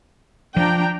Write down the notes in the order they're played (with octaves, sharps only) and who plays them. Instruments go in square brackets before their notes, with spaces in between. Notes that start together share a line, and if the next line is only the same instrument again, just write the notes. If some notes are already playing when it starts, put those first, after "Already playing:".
[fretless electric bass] F3 [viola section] D4 G5 A#5